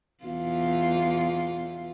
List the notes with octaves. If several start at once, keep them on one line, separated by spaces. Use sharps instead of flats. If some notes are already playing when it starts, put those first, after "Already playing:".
E2 F4